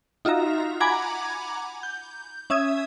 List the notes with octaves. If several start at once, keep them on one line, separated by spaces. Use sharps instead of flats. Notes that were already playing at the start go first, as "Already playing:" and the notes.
D#4 F4 F#4 E5 A#5
F#5 G#5 A#5 B5 D6 G#6
G6
C#4 E5 D#6 G#6